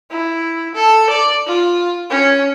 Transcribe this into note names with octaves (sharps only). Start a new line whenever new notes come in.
E4
A4
D5
F4
C#4